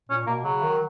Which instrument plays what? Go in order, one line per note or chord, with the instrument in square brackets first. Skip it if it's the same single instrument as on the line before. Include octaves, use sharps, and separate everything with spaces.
[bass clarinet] A#2 [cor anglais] C#4
[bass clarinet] B2 [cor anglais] A#3
[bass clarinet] C#3 [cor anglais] F#3
[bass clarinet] D#3